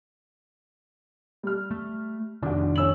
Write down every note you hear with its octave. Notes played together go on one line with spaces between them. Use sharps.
G3 F6
A3
F1 D#3 D4 F#4
C#4 E6 F#7